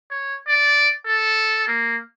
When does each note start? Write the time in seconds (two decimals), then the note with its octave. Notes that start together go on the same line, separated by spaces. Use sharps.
0.11 C#5
0.48 D5
1.07 A4
1.68 A#3